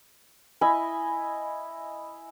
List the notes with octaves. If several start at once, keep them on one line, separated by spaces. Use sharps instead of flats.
E4 D#5 G#5 B5